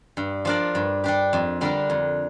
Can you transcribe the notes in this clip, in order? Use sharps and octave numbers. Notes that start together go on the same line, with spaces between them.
G2
F3 D4 A#4 D5
G2
G3 D4 G4
F2
D3 G3 D4 A#4
F2